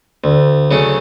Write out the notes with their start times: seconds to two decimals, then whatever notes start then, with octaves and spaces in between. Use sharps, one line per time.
0.24 D2
0.71 C#3 F#3 A3 C#4